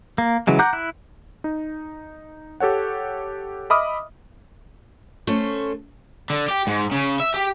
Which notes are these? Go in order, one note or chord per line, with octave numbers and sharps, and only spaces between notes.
A#3
C#3 E3 F#3 G#3
F#5 A#5 D6 F#6 G6
E4 F#6
D#4
G4 A4 C#5 F#5
D#5 E5 B5 D6 D#6 F6
A3 C#4 A4 C5
D3
G4
G#2
C#3
E5
G4